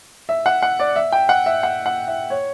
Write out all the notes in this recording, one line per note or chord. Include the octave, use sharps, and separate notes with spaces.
E5
F#5
F#5
D5
E5
G5
F#5
E5
F#5
F#5
E5
C#5